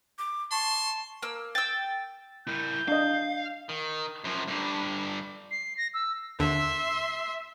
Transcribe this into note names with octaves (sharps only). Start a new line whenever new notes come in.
D6
A5 C6 C#6
A#3 E6
G5 E6 A6
E4 A#4 G6
D4 D#5 F5
D#3
F#2 F3
G2 D3
C7
A#6
E6
D#2 D3 E5 C6